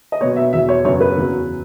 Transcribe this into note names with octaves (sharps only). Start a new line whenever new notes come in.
D#5
B2 F#3 B3 C#5
E5
E2 B2 F#3 E5
C#5
F#2 C#3 F#3 B3 C#5
B4
E2 C#3 F#3